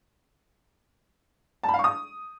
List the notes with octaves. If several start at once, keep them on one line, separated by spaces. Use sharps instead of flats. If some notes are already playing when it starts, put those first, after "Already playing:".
A5
B5
F5
C#6
D#6